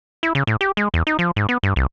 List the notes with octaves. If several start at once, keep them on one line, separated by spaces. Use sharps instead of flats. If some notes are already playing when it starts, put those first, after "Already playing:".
E4
C#3
A2
G4
G#3
E2
D#4
F3
G#2
B3
G2
C2